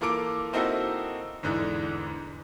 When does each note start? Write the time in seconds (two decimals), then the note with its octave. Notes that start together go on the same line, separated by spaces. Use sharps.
0.01 E3 A#3 F4 A4 D6 D7
0.53 A#3 C4 D#4 E4 F#4 A4
1.43 E2 G#2 D3 E3